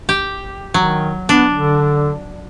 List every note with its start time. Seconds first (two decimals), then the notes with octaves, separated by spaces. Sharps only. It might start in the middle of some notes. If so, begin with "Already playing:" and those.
0.09 G4
0.74 D#3 F#3
1.29 B3 D4
1.54 D3